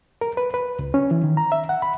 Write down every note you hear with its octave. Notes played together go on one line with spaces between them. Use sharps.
A#4
B4
B4
C#2
C#4
E3
D#3
A#5
E5
F#5
B5